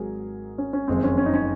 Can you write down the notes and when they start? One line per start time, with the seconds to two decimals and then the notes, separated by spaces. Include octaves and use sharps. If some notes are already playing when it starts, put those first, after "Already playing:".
Already playing: G#1 G#2 F#3 G#4 A#4
0.58 C#4
0.73 C#4
0.88 F#1 F2 D#3 G#3 C4
1.04 C#4
1.18 C#4
1.26 D#4
1.34 C#4